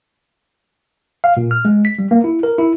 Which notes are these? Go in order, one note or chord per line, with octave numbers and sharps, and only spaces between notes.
F5
A#2
F6
G#3
B6
G3
A#3
E4
A#4
E4